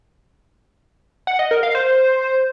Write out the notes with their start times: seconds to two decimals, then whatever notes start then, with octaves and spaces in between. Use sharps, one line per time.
1.27 F#5
1.39 D#5
1.51 A#4
1.63 F5
1.75 C5